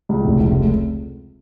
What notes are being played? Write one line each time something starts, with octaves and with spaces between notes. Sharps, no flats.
C#2
F1
F1
C#2